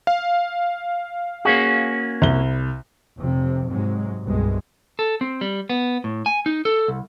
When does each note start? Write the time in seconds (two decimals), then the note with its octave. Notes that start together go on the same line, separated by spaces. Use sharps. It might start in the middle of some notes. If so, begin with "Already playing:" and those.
0.07 F5
1.45 A#3 C#4 F#4 G#4
2.22 C2 G7
3.19 F1 C3 F3
3.69 G#2 C3 F#3 G#3
4.23 C2 G2 B2 G#3
4.99 A4
5.21 C4
5.41 G3
5.70 B3
6.04 A2
6.26 G#5
6.46 D#4
6.65 A4
6.88 C2